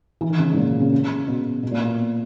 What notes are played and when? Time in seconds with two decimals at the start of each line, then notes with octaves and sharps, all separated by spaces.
0.21 E3
0.30 D#3
0.39 C#3
0.51 G#2
0.57 A#2
0.80 C#3
0.93 C#3
1.04 C#3
1.28 B2
1.63 B2
1.71 A#2
1.79 B2